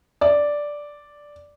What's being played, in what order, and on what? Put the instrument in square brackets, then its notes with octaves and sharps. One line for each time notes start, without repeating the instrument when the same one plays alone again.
[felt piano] D5